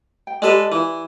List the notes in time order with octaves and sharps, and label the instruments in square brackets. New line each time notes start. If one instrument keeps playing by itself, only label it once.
[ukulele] G5
[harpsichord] G#3 A4 B4 [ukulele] G4 D5
[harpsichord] E3